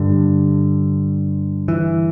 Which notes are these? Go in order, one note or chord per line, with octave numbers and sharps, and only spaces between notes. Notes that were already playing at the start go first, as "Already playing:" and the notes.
Already playing: G2 D3
E3